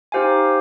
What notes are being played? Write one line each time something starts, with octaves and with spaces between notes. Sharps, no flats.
D#4 G4 C5 F5 G#5